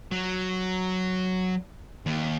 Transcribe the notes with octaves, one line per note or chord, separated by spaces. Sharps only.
F#3
D#2